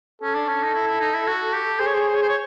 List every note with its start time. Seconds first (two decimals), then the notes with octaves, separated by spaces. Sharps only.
0.22 C#4 A4
0.35 D4
0.48 C#4
0.64 D#4
0.74 E4
0.88 E4
1.01 D#4
1.14 E4
1.28 F#4
1.54 G4
1.80 G#4 C5
1.86 C#5
1.94 C5
2.00 C#5
2.08 C5
2.15 C#5
2.22 C5
2.29 C#5